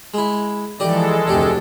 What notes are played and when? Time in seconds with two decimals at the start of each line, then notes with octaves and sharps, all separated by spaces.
0.14 G#3 E4
0.80 E3 F3 G#3 G4 A4 D5 D#5
1.28 F1 D2 D4 G4